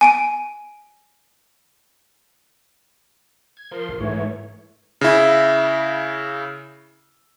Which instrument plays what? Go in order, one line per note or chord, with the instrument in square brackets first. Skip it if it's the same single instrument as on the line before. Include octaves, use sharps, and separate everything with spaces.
[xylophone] G#5 D7 D#7
[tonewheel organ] G#6
[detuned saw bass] F3 [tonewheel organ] A#4 C6
[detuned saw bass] A#1
[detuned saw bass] G#2 [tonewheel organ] E3 A3 C#5
[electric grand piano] C#3 E4